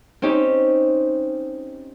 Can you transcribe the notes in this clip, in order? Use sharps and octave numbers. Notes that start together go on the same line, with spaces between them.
C4 C#4 D#4 G4